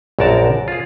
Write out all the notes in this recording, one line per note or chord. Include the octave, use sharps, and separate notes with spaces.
A#1 F#2 F#4 A#4 D5 A5
F4 G#4